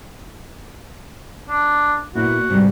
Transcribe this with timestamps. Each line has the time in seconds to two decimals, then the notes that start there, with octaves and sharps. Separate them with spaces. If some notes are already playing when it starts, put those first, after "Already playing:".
1.48 D4
2.15 A#2 B3 E4 F#4
2.50 G#2 C3 G3